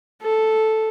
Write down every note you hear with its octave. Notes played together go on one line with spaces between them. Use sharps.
A4